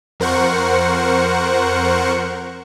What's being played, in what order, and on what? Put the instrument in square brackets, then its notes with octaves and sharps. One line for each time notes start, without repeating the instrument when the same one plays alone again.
[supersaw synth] F2 A#4 C5 F#5 C#6